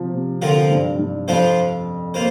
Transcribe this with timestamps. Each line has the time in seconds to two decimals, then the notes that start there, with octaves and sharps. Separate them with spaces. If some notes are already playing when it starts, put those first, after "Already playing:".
Already playing: C3 F3
0.13 C3
0.42 D3 F3 C4 F4 A#4
0.70 G2
0.99 G2
1.28 F2 F3 D4 F4 C5
2.14 A#3 F4 C5